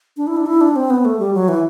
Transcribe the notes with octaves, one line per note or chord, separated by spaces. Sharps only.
D4
E4
D4
E4
D4
C4
B3
A3
G3
F#3
E3